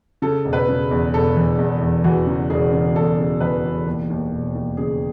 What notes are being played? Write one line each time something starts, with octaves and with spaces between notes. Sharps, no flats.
C#3 A4
E1
B4
C#3
E2
E1 A4
E3
E2
E2
E3 F#4
C#3
E1 G#4
C#3
E2 A4
C#3
E3 B4
E1
D#2
D#2
E1
D#2
C#3 G#4